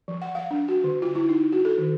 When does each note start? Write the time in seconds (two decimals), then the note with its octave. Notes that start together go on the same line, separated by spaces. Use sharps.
0.08 F3
0.22 F#5
0.35 F5
0.51 D4
0.68 F#4
0.84 D3
1.02 F4
1.15 E4
1.29 D#4
1.52 F#4
1.65 A4
1.78 D#3